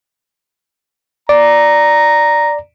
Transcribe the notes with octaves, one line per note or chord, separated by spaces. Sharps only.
D5 A#5